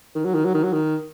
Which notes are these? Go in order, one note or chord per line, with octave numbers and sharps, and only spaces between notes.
D#3
F#3
D#3
F#3
D#3
F#3
D#3